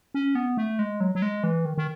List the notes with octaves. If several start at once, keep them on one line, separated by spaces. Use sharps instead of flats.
C#4
B3
A3
G#3
F#3
F#3
G#3
E3
D#3
D#3